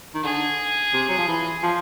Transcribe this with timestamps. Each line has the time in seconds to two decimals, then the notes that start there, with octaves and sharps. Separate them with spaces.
0.14 D#3
0.24 D3 G#4
0.94 C3
1.09 F#3
1.18 F3
1.28 E3
1.63 F3